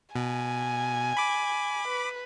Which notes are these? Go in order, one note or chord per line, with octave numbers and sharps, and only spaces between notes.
B2 G#5
B5 D6
B4